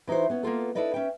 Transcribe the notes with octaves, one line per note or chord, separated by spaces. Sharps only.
E3 D#4 E4 F#4 C5
B3 C#4
A#3 B3 F4 A4
D4 E4 A4 B4 D5 D#5
C#4 E5 G5